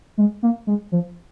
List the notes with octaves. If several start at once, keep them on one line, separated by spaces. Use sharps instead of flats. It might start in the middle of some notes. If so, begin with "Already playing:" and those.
G#3
A#3
G#3
F3